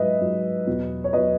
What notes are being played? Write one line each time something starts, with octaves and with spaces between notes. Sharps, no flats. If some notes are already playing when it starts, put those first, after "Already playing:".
Already playing: G#2 F#3 B4 D#5 E5
G#2 F#3
E2 B2 F#3
C#5
E2 B2 F#3 B4 D#5